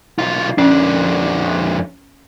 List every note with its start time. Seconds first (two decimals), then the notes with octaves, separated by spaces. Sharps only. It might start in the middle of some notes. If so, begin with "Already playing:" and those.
0.19 B1 F4
0.58 F2 C#4 D4